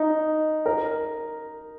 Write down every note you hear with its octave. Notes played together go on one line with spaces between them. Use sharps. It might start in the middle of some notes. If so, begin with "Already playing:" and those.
Already playing: D#4
A#4